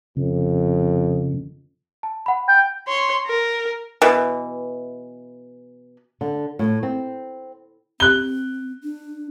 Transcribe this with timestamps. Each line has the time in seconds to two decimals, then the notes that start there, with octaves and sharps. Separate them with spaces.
0.17 F2 C#3
2.03 A5
2.26 F#5 B5
2.48 G5
2.88 C#5 C6
3.27 A#4
4.02 B2 E3
6.21 D3
6.59 A2
6.83 C4
8.00 C4 F#6 G7
8.83 D4